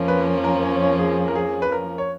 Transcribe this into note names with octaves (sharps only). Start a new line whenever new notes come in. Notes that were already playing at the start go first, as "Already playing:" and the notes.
Already playing: F2 F3 A#3 C#4
B4
A#4
C#5
C#5
G#4
A#4
G#4
B4
A#4
C#5